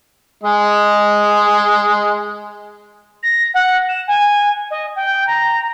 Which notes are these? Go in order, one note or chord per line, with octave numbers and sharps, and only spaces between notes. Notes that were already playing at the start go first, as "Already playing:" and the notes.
G#3 D#5
A#6
F#5
E7
G#5
D#5
G5
A#5